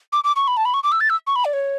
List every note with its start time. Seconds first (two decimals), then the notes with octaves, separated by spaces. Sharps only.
0.12 D6
0.24 D6
0.36 C#6
0.47 B5
0.57 A5
0.65 B5
0.74 C#6
0.83 D6
0.92 E6
1.00 A6
1.10 E6
1.27 C#6
1.36 B5
1.45 D5
1.53 C#5